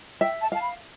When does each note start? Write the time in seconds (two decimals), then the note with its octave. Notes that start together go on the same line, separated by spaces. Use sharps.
0.21 E5 G5
0.41 A5
0.52 F5 A5
0.61 B5